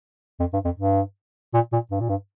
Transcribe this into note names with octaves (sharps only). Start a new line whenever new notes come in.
F2
G2
F2
G2
A#2
A#2
G2
A#2
G2